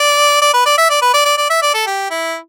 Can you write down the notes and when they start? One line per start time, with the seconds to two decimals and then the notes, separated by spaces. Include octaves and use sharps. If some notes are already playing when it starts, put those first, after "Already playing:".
Already playing: D5
0.42 D5
0.54 B4
0.66 D5
0.78 E5
0.90 D5
1.02 B4
1.14 D5
1.25 D5
1.38 D5
1.50 E5
1.62 D5
1.74 A4
1.87 G4
2.11 E4